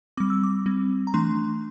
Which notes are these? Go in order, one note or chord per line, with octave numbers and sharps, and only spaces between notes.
G3 C4 D6
E6
D6
G3 C4
A#5
E3 A3 D4 C6